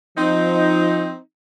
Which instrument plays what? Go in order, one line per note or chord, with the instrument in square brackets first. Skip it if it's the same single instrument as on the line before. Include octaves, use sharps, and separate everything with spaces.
[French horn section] F3 [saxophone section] C4 D#4